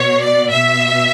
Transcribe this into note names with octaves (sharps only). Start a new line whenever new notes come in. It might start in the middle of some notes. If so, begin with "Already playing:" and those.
Already playing: B2 C#5
D5
B2 E5